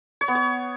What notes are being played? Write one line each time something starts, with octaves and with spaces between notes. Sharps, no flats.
C#5
B3
C#5